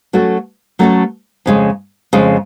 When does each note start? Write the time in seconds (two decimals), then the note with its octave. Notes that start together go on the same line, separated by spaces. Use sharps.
0.13 F#3 A3 C#4 F#4 A4
0.79 F#3 A3 C#4 F#4 A4
1.46 F2 C#3 G#3
2.13 F2 C#3 G#3